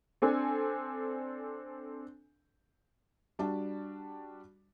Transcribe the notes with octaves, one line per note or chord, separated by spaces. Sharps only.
C4 D4 A4 G#5
G3 D4 F#4 A5